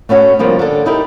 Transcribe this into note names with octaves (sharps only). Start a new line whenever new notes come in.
A3 B3 C#4 F#4
C3 F3 G3 A#3 D4
D3 A4
D#4 E4 G4 A#4